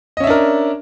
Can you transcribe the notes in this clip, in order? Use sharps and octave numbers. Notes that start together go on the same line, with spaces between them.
C#4 D4 A#4 D#5 E5